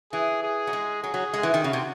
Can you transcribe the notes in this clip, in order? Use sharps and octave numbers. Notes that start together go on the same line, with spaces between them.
E3 G#4
G#4
F#3
G#3
F#3 G#4
F#3
G#3
E3
D#3
C#3 F#4
C3